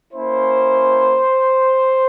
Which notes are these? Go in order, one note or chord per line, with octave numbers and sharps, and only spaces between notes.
A#3 C#4 E4 C5